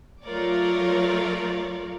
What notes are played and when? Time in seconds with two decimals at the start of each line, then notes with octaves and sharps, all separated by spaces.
0.24 F#3 A3 F4 A#4 C#5 D5